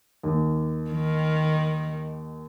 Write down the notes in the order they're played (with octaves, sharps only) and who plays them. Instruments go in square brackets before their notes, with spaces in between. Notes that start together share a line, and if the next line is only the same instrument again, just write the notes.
[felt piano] D#2
[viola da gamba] D#3